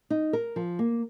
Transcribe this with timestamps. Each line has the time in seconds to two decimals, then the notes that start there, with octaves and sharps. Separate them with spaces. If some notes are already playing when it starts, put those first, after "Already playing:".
0.10 D#4
0.33 A#4
0.56 F3
0.79 A#3